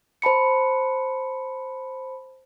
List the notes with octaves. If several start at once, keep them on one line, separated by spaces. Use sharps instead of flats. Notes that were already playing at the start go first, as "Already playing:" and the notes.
C5 A5 B5 C#7